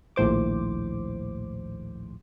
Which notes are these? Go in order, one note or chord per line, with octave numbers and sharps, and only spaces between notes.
A#1 D#2 A2 C5 D6